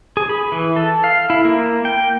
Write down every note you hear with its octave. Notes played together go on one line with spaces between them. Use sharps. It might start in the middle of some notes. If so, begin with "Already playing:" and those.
G#4
B5
E3
A4
F5
E4
A#3
G5